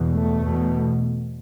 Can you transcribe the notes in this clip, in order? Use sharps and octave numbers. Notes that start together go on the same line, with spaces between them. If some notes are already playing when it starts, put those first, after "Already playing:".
Already playing: E2 B2
A3
E2 B2